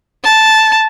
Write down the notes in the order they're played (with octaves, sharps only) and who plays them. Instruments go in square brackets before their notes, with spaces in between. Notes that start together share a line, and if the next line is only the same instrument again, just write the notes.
[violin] A5